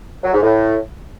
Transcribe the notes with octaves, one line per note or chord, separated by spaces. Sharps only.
F#3
G#2
A2